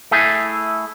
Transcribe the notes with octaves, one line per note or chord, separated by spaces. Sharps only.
A3 E4 G#4